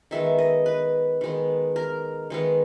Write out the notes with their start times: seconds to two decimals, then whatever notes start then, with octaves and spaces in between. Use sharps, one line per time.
0.11 D#3 G#3 B3 E5
0.39 D#5
0.66 B4
1.21 D#3 G#3 B3
1.76 A#4
2.30 D#3 G#3 B3